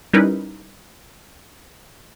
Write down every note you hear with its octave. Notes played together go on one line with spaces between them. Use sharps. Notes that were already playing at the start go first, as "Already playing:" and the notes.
G3 C#4 D#4 E4 A#4 B4